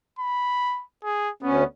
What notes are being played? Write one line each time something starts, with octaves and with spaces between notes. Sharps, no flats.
B5
G#4
D2 B3 C#4